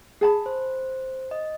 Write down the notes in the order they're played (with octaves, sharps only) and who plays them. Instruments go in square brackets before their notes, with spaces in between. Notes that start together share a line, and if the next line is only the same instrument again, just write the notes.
[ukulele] G#4 A5 B5
[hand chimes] C5
D#5